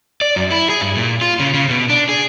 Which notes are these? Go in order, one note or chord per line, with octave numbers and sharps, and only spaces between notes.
D5
F#2
E4
G#4
G2
A#2
F4
C#3
C#3
B2
D4
G#4